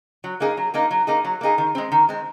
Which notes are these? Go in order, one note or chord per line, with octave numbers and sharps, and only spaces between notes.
F#3
A#3 D#4 G#4
F#3
A#3 D#4 G#4
F#3
A#3 D#4 G#4
F#3
A#3 D#4 G#4
D#3
G#3 C4
D#3
G#3 C4